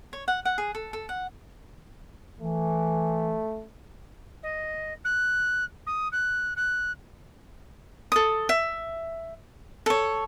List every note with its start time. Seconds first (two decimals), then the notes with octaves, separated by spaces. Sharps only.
0.13 C#5
0.28 F#5
0.45 F#5
0.58 G#4
0.75 A4
0.93 A4
1.09 F#5
2.40 E3 A3
4.43 D#5
5.04 F#6
5.86 D#6
6.12 F#6
6.56 F#6
8.12 A4 D#6
8.49 E5
9.86 A4 C#5